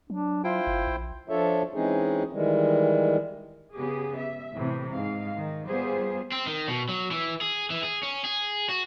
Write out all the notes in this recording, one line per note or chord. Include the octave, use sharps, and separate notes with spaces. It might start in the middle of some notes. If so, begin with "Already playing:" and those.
F#3 D4
E4 F4 C5 G5
G1
A#1
F3 D4 F4 A4 C#5 E5
E3 G#3 C4 C#4 D#4 G#4
D#3 E3 G3 G#3
C#3 B3 G4 G#4
E5
A2 C3 E3
G#2 F5
D#3
G3 B3 F4 G#4 C5
C4
D#3
B2
F#3
E3
G#4
E3
G#4
C#4
G#4
F#4